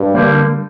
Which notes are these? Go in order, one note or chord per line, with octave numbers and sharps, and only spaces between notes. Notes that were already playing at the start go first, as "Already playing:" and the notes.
Already playing: G2
D3 G3 A#3